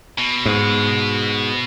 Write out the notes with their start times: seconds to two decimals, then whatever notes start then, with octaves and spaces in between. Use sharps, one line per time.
0.18 B2
0.46 G#2